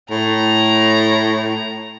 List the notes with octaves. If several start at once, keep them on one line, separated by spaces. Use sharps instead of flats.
A2 A#5